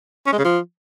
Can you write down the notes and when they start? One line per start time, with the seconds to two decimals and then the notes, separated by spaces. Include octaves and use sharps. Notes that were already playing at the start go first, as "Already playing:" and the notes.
0.27 C#4
0.33 G#3
0.39 C#3
0.45 F3